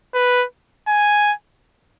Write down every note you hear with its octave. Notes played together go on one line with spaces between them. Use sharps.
B4
G#5